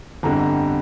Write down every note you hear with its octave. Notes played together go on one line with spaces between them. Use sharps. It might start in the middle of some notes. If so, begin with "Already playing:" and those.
G1 F2 D3 G3 A#5
A#5